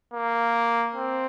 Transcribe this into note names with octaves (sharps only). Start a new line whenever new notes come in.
A#3
C4